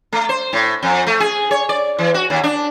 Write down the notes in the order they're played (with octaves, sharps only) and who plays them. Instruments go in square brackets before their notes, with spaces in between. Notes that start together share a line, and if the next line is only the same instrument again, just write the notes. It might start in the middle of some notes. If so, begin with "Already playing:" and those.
[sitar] A3
C5
A2
F2
A3
G#4
C#5
D5
E3
F#4
D#2
D4